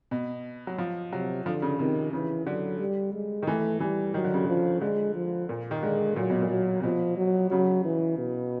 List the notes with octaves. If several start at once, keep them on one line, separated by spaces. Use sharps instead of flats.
B2
F#3
F3
C3 F#3
D3 F3
C#3
C3 D#3
C#3 E3
D3 F#3
G3
G#3
D#3
E3 A3
E3 G3
D#3 F#3
D3
C#3
D3 F3
D3 G#3
F3
A#2
D#3
D3 G#3
A#2 F#3
B2
A#2
F#3
C3
B2 F3
F#3
C#3 F#3
E3
B2